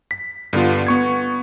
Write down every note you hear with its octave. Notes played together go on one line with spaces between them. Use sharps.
B6
G2 D3 B3 F4
B3 C#6 G#6